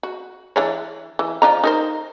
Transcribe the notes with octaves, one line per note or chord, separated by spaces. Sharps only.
F#4
E3 D4 C#5
E3
F3 D4 A#5
D#4 A#4 C5